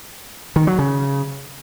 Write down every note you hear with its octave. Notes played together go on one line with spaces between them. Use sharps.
D#3
F#3
C#3